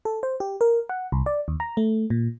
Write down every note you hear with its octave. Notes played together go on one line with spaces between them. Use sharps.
A4
C5
G4
A#4
F#5
C2
D5
D#2
A#5
A3
A#2